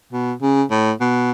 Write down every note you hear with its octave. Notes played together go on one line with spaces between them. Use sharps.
B2
C#3
A2
B2